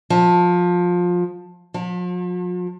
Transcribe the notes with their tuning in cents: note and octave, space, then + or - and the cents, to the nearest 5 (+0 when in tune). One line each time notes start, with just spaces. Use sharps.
F3 +20
F3 +45